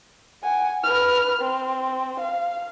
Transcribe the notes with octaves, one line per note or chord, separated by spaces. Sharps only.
F#5 G#5
B4 F6
C4
F5